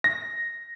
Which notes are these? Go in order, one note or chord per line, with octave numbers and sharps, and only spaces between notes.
A#6